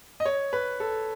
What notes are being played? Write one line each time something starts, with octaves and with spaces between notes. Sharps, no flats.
D#5
C#5
B4
A4